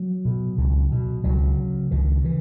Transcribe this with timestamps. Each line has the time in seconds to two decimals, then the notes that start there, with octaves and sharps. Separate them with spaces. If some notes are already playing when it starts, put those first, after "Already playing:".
Already playing: F#3
0.25 B2
0.58 C#2
0.92 B2
1.24 C#2 F#3
1.58 C#3
1.91 C#2 D#3
2.24 C#3 E3